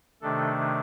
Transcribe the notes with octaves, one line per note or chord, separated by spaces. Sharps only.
C3 D#3 A3 D4 A4